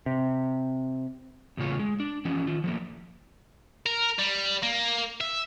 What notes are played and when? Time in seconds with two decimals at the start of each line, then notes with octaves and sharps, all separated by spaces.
0.06 C3
1.57 E2 A2 C#3 F4 C#5
1.79 G#3
2.00 D4
2.25 E3 F3 C#4
2.47 D#3 F4
2.64 F3 A3 A#3
3.86 A#4
4.19 G3
4.63 A#3
5.21 E5